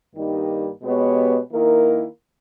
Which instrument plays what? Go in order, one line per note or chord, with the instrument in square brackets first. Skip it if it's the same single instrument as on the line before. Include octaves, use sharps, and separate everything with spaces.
[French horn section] G2 D#3 G3 A#3 D#4
B2 G#3 B3 G4 C#5
D#3 A#3 E4 A#4